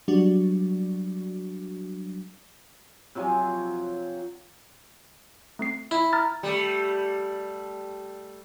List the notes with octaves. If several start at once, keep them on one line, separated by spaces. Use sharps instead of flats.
F#3 G3 D4 F#4
C3 F3 F#3 G#5
A3 C4 C7
E4
A#5 F6 A6
G3 A3